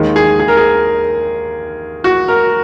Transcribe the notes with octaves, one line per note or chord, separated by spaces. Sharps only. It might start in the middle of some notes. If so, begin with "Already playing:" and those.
Already playing: D#2 D#3 G#3
G#4
G#4
A#4
G#4
F#4
A#4